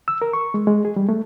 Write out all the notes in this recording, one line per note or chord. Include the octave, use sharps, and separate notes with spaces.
E6
A#4
C#6
G#3
G#3
G#4
G3
A3